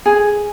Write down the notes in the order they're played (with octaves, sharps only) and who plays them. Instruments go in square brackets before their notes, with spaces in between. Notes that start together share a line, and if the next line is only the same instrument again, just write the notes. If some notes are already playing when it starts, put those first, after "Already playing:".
[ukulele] G#4